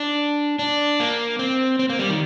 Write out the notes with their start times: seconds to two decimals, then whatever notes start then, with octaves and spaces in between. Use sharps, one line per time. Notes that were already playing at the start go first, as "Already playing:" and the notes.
Already playing: D4
0.59 D4
1.00 A#3
1.39 C4
1.79 C4
1.89 A#3
1.99 G3
2.09 D#3